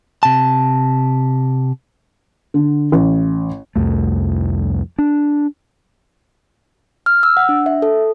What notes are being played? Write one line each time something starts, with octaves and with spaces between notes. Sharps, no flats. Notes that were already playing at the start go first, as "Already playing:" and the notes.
C3 A5
D3
A1
C2 F2 A3
D4
F6
E6
F#5
D4
E5
A4